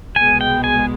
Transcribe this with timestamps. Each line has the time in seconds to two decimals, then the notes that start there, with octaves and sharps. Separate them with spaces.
0.16 C2 B2 G#3 B3 G#5
0.41 G5
0.64 G#5